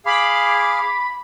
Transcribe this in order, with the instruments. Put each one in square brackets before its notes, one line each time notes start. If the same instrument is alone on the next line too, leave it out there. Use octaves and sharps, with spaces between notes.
[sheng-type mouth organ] G#4 F5 [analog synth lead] B5 [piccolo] D6